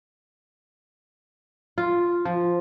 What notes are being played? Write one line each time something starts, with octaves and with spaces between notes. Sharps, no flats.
F4
F3